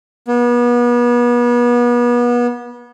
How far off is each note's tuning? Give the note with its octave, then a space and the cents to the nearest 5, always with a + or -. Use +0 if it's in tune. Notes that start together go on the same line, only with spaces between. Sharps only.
B3 -35